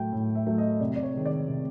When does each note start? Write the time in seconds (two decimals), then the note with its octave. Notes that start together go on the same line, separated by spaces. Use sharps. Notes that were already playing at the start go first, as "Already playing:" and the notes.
Already playing: A2 F#3 A3 G5
0.13 A2
0.35 E5
0.47 F#3 A3
0.58 D#5
0.80 C3 D5
0.96 D5
1.03 C#5
1.14 D#3 G#3
1.26 D5
1.48 C3